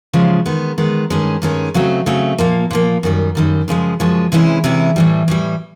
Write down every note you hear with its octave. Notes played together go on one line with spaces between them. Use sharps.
C#3 F3 G#3
D#3 G#3 B3
D#3 G#3 B3
G2 D#3 G#3 C#4
G2 D#3 G#3 C#4
C#3 F#3 A3 C4
C#3 F#3 A3 C4
A#2 F3 A#3
A#2 F3 A#3
F#2 D#3 G3
F#2 D#3 G3
F#2 C#3 F3 G#3
F#2 C#3 F3 G#3
C3 E3 G#3 C#4 E4
C3 E3 G#3 C#4 E4
A2 E3 G3
A2 E3 G3